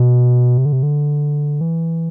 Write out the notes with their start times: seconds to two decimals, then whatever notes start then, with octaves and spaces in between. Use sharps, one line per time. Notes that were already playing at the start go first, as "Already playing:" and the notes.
Already playing: B2
0.58 C3
0.65 D3
0.73 C3
0.83 D3
1.61 E3